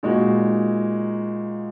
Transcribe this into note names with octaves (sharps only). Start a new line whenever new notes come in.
A#2 G#3 D#4 F#4